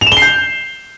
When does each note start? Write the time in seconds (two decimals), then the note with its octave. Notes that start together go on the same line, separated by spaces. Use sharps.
0.01 F7
0.06 E7
0.12 G7
0.17 C7
0.22 G6